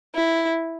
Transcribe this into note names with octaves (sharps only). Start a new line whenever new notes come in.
E4